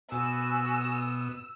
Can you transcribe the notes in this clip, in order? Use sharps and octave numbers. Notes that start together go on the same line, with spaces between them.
B2 F#4 B4 G#5 E6